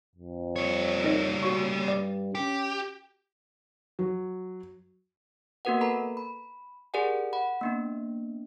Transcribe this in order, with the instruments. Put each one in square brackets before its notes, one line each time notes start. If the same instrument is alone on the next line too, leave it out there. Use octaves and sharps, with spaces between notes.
[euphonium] F2
[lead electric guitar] G3 C#5
[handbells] D#4 A#4 D#5
F#4 C#6
[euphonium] G2 [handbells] D5
[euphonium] C#4 [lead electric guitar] G4
[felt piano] F#3
[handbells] A#3 B3 F#4 A#4 B4 F#5
A4 B4 A#5 B5
B5
G4 G#4 A#4 D5 F#5 G#5
F#5 B5
A#3 B3 D4